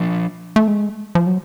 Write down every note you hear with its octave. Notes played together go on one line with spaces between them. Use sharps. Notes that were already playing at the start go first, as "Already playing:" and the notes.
Already playing: F3 D4
A3
G#3
F3
F#3